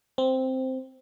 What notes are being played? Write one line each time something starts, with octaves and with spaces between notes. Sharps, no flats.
C4